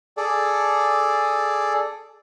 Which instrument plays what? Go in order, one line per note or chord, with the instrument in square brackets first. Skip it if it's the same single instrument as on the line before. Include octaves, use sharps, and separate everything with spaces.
[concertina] G#4 A4 D5